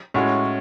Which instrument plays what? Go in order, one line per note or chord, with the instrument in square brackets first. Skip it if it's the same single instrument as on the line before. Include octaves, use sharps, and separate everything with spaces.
[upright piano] A2 G#3 C#4 F#4